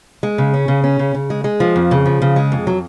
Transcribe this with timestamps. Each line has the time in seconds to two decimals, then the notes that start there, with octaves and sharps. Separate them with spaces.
0.23 G#3
0.38 C#3
0.54 C#4
0.68 C#3
0.84 C#4
0.99 C#3
1.15 C#3
1.30 G#3
1.44 G#3
1.60 F3
1.76 F2
1.91 C#3
2.06 F3
2.22 C#3
2.36 G#3
2.52 F2
2.67 F#3